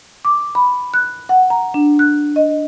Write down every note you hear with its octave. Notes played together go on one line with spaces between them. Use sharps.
D6
B5
F#6
F#5
A#5
D4
F#6
D#5